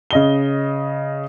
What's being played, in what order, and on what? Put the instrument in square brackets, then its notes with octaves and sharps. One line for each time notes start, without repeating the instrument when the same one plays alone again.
[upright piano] C#3 D#5 G7